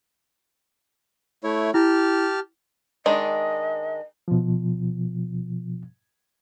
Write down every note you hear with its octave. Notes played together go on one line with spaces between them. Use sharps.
A3 E4 C#5
E4 G4 A5 F6
D#3 G#3 D4 D#5
B2 F3